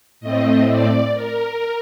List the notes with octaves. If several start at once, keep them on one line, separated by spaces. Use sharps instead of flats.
A2 A3 C4 D#5
D5
A#4